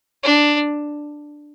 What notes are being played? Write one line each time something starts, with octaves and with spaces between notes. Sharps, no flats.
D4